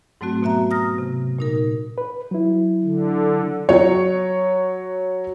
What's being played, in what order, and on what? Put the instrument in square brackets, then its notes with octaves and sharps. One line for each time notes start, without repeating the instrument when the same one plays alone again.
[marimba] G#2 F#3 A3 C4 F#4
B2 B3 F#4 E5 A#5
A#5 D#6 F6 A#6
C3
A#2 D#4 A#4
[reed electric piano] B4
F#3 E4
[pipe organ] D3
[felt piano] F#3 C#5